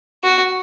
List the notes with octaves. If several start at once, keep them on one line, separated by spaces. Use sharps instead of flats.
F#4